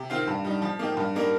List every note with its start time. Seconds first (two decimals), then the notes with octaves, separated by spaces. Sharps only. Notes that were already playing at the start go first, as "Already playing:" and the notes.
Already playing: C3
0.10 D#3 C4 F4
0.27 G2
0.45 G3 D#4
0.62 F3
0.79 A#3 D#4 G4
0.97 G2
1.15 G3 A#3 D#4 A#4